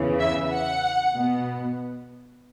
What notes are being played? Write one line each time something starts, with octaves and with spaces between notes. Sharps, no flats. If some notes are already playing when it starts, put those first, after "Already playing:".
Already playing: E2 C#3 E3
E5
F#5
B2 B3